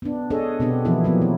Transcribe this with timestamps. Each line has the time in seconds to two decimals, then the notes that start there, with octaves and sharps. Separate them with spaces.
0.02 B3 D4
0.30 D4 G#4 A4 C#5 D#5
0.60 B2 B3 C4 D4 G4
0.85 E3 F3 A#3 B3 E4 G#4
1.04 F3 F#3 A#3 B3
1.22 E4